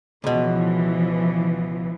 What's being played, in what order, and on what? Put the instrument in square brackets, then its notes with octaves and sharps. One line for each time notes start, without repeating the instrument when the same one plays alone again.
[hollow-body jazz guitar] C#2 B2 [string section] E3 F3